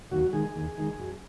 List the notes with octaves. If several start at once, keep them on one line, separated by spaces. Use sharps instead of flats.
D#2 F#3 F#4
D#3 G#3 G#4
D#2
D#3 G#3
F#2